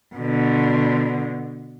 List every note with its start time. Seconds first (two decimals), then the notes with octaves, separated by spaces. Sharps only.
0.16 B2 D3